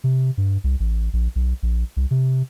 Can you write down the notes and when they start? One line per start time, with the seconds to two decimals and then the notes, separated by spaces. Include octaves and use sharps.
0.04 C3
0.37 G2
0.64 C2
0.80 A1
1.13 A#1
1.36 B1
1.63 A#1
1.97 C2
2.11 C3